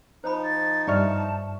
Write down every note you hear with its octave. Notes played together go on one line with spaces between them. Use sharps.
F3 D#4 C5 B5
A6
G2 D5 E5 A5 C#6 F6